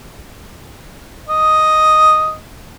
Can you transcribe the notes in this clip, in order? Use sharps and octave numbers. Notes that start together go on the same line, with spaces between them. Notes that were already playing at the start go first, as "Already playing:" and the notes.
D#5